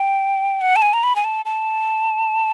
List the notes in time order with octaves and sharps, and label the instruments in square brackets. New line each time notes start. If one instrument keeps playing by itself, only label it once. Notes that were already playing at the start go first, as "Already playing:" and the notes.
Already playing: [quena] G5
F#5
A5
G#5
A#5
B5
G#5
A5
A5